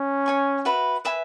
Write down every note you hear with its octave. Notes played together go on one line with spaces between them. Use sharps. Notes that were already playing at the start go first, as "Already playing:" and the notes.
Already playing: C#4
C#5 G#5 C#6
F#4 B4 E5 B5
B4 E5 G#5